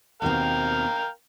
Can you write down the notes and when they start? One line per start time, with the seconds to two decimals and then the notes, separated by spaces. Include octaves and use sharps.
0.22 D#2 B2 C4 A#4 F5 G5